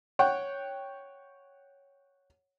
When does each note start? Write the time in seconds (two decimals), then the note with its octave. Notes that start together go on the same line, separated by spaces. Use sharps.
0.19 C#5 F#5 G5